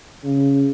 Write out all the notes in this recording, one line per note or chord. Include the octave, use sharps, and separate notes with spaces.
C#3